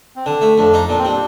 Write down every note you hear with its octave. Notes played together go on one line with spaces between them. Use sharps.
C4
D3 D4
A3
F2 D4
D#4
A#2 D4
C4
G3 D4